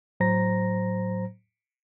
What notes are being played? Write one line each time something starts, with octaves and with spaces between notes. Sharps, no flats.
A2 F#3 C5 A#5 A#6